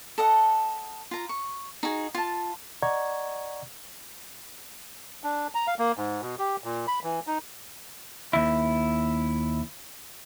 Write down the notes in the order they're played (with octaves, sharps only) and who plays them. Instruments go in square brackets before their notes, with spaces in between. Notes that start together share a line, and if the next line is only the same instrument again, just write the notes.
[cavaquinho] A4 D#5 F#5
F4 A#5
C#6
D#4 F#4 G#4
F4 A5
[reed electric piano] D5 D#5 F#5 A#5 C#6 G#6
[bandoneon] D4
A#5
F5
A#3
G#2
B2
G4
A#2
B5
E3
D#4
[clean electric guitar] D#2 E4